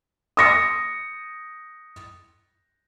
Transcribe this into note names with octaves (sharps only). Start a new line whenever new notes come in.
D#6 A#6 C#7